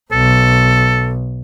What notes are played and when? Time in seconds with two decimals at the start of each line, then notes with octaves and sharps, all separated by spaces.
0.12 B1 A4